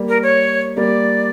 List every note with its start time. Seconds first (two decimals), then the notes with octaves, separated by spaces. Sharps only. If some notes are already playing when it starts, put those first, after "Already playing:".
Already playing: G3 A#3
0.09 A#4
0.23 C#5
0.77 G3 A#3 D5